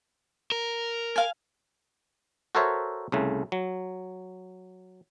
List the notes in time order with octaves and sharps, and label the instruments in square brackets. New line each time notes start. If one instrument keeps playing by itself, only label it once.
[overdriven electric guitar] A#4
[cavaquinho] F5 G#5
[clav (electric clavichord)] F#4 A4 A#4 C5 C#5 E5
C2 C#3 A3
F#3